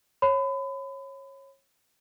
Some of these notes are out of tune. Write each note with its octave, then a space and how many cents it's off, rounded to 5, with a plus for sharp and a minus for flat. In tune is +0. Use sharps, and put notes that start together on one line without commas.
C#5 -25 B5 +35